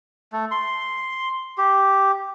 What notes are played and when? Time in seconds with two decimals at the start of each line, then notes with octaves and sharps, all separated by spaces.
0.33 A3
0.51 C6
1.58 G4